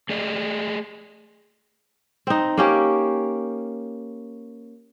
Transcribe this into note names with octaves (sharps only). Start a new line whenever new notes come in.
A3 G#4 D5 D#5
C4 D#4
A#3 C#4 G4